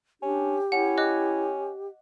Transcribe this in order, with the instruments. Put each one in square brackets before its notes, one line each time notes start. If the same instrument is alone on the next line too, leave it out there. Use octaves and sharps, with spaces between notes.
[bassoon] C#4 [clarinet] D4 [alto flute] G4
[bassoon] C#4 [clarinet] E4 [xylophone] F#5
[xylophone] D#5 D6 F#6